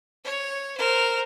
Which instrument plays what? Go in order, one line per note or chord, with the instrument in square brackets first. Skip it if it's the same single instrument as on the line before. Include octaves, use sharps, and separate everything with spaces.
[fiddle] C#5
A#4 C5